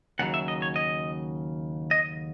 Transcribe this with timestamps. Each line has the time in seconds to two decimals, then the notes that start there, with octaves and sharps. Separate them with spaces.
0.19 D#2 C#3 F#3 F#5
0.34 E5
0.48 D#5
0.62 C#5
0.76 D#5
1.91 D#5